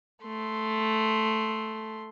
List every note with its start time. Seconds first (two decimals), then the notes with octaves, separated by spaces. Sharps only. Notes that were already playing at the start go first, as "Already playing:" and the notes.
0.23 A3 C6